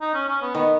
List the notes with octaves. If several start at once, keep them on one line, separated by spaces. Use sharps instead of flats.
D#4
C#4
C#4
B3
D#3 B3